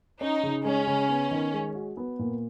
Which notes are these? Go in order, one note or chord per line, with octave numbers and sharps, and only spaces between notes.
C#4 D#4
C#3
G#3 C#4
C#3
B3
D#3
G#3
F#4
B3
A#2